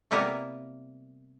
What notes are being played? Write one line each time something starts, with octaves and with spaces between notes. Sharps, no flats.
C3 G3 A#3 B3 E4 A#4